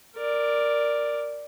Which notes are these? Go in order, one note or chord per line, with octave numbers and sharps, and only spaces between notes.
A#4 D5